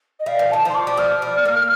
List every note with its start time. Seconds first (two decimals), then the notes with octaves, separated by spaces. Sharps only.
0.19 D#5
0.26 G3 F5
0.39 F3
0.51 D#3 A5
0.65 F3 C6
0.74 D6
0.87 G3
0.97 F3 F6
1.22 G3
1.45 A#3